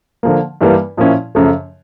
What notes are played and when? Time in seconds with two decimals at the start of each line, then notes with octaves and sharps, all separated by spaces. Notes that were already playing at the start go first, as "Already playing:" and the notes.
0.23 D3 F3 A#3
0.61 G2 E3 G3 A#3
0.97 A#2 F3 A#3 C#4 E4
1.35 F#2 C#3 F3 A3